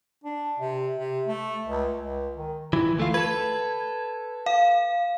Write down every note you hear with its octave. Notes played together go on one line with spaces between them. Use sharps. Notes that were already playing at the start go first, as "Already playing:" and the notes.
D4
C3
C3
A3
C#2
C#2
D#3
E3
D2 A3 F4
A4 B4 G#6
F5